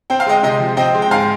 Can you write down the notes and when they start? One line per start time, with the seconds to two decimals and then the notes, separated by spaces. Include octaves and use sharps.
0.10 C4 G5
0.20 F5
0.26 G#3 D#5 G5
0.43 C3 D#5 G5
0.60 F3
0.77 C4 D#5 G5
0.94 G#3
1.02 G5
1.11 G#2 F5 G#5